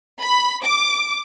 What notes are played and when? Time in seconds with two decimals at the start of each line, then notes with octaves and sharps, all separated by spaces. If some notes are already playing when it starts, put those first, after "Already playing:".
0.21 B5
0.64 D6